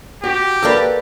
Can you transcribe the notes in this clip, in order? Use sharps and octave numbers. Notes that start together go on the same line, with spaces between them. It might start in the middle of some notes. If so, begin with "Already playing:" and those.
F#4 G4
A#3 F#4 A4 B4 D5 A5